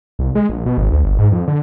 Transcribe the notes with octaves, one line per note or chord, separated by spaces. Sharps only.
C2
G#3
A#1
B2
G#1
D2
G1
G#2
F2
D3